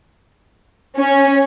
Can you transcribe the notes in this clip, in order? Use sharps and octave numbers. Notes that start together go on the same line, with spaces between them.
C#4